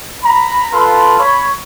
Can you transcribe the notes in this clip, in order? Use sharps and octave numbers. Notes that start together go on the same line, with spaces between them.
A#5 B5
F4 A4 B4 B5 C6
C#5 B5